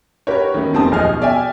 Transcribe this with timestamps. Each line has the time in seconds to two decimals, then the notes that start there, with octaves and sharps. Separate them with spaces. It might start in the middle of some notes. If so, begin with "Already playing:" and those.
0.27 F#4 G4 A#4 B4 C#5
0.54 D#3 A3 B3 C#4
0.73 F1 A#3 C4 G4 A5 D#6
0.92 A#1 D#2 F3 G#4 D#5 F6
1.05 B2
1.22 D5 E5 G5 G#5